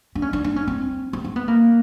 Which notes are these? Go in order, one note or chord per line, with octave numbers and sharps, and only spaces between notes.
D4
C#4
D4
D4
C#4
C4
C4
C4
B3
A#3